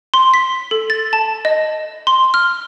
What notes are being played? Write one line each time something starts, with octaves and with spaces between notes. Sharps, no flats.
C6
B6
A4
A6
A5
D#5
C6
F6